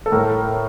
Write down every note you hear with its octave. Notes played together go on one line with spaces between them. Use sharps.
A4
A2 A#4